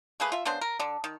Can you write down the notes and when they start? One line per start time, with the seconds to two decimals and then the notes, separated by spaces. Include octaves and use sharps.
0.20 A3 A#3 G#4 B4
0.32 F4 E5
0.45 C#3 B3 D4 C5
0.61 A#4
0.79 D3 D4
1.04 D#3